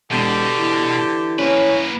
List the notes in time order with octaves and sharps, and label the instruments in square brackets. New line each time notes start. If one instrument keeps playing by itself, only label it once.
[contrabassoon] E1 [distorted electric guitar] B2 [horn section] D3 G4
[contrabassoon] E3
[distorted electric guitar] A#3 B4 [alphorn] C#4